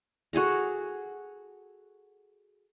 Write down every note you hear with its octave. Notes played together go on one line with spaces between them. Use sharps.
F#4 G#4 A4 A#5